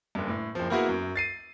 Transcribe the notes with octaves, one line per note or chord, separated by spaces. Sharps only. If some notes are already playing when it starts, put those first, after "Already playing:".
F#1 G2
A2
F#1 F3
A#3 B3 E4 F#4 G#4 A#4
F#2
A6 C7 D#7